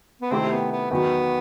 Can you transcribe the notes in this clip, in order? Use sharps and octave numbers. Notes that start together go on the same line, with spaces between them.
B3
C3 D#3 A3 C4 E4 G4
B3
B3
E2 D#3 F#3 B3